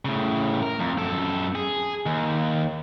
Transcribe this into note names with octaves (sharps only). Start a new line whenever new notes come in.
A2 C#3
A#4
F2
F#2 A4
G#4
D#2